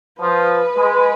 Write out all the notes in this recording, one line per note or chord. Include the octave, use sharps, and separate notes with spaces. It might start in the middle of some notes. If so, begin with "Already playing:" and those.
F3 B4
G#3